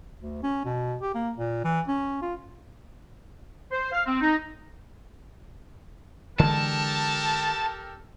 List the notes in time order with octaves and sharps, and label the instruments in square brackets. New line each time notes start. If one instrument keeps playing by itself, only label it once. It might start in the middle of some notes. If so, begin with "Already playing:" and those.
[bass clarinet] D2
C#4
B2
G4
A#3
A#2
E3
C#4
F4
[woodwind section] C5
F5
C4
D#4
[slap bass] D3 E3 G#3 [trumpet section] G4 A4 A#4 [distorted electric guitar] A5